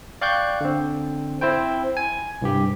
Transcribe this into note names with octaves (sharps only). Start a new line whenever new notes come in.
D5 F5 G5 C#6 F#6 G6
D3 C4
C4 E4 C5 G5
G#5
C2 G2 G4